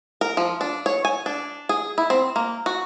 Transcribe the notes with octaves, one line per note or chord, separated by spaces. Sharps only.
A#4
F3
D4
C#5
G#5
D4
G#4
E4
C4
A#3
F#4